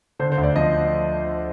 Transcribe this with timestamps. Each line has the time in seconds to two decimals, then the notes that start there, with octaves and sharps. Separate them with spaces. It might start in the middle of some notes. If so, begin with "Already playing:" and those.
0.19 D3 C5
0.32 C5
0.38 D2
0.43 D5
0.56 F3 D#5